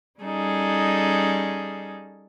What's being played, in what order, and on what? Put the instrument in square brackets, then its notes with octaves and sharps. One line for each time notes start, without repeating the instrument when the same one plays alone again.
[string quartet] G3 C#4 D#4 G#4 A4